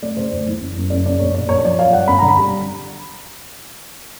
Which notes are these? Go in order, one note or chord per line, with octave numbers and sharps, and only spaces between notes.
A3 D5
C#3 C5
D2
E3
F#1
F#2
F#1 D5
C#3 D5
A#1 C#5
A#2 D5
A#1 C#5
C#5
F3 D5
F#3 F5
G2 F#5
G1 B5
D3 A#5
B5
G3